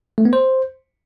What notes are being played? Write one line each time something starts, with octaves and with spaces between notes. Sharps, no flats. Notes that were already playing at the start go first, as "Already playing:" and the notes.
A3
B3
C5